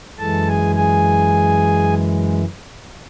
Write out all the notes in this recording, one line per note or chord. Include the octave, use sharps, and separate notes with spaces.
F#2 E3 G#3 A4 A5
G#4 G#5
G#4 G#5